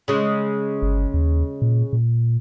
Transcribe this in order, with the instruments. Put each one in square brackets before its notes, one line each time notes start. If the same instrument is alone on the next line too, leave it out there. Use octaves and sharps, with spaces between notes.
[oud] C#3 G#3
[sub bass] G1
D#2
A#2
A#2